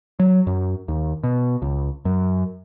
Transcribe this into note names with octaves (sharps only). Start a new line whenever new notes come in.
F#3
F#2
D#2
B2
C#2
F#2